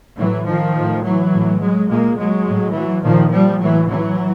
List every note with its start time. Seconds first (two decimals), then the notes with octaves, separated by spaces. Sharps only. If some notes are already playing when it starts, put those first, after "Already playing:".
0.17 A2 E3 F#3
0.46 D#3 F3
0.75 A2
1.04 E3 F#3
1.32 A2
1.61 F#3 G#3
1.89 A#2 G#3 A#3
2.17 F#3 G#3
2.46 A2
2.74 E3 F#3
3.03 A#2 D#3 F3
3.31 F3 G3
3.60 A2 E3 F#3
3.89 E3 F#3